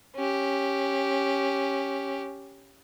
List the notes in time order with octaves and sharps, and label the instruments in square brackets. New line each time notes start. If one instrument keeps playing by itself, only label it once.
[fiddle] C#4 G4